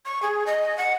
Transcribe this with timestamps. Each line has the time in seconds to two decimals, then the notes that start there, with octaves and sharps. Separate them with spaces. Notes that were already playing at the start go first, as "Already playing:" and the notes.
0.05 C#6
0.22 G#4
0.47 D#5
0.78 F#5